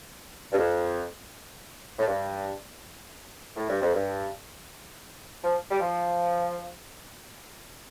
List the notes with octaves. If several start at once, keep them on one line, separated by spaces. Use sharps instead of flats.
G2
F2
A2
G2
A2
G2
F2
G2
F3
G3
F3